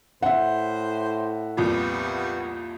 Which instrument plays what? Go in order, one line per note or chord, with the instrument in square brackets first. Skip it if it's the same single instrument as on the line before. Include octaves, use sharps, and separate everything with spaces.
[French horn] A2 [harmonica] C5 [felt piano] E5 F#5
[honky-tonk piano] C2 F2 A#2 [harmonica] G3 B3 F#4